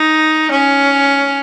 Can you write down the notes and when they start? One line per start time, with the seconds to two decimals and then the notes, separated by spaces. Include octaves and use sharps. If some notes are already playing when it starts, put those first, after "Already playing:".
Already playing: D#4
0.51 C#4